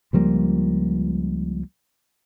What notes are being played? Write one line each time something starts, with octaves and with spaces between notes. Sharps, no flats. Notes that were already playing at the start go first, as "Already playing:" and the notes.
C#2 F3 G3 A#3